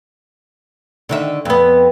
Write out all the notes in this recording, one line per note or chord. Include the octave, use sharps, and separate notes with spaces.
D3 D#3 E5
F2 B3